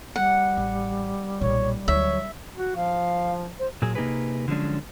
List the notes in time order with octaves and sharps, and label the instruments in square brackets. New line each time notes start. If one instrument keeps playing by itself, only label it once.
[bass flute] G3 [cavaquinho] F#5
[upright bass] A1
[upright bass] B1 A#2 [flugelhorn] C#5
[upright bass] D2 F#3 [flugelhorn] C#5 [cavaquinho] E5
[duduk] F#4
[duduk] F3 [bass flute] F5
[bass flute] C5
[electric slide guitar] A#2 F#3 G#4
C3 A#3 D#4 G4 G#4 B4
D3 F3 F#3 G#3 C#4 D4